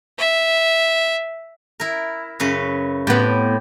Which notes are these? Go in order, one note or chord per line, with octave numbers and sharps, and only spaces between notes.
E5
E4 A#4
F#2 C#3 B4
A2 B3 C4 G4